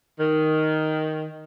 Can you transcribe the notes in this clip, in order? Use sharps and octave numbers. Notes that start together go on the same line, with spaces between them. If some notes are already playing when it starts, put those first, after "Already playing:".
D#3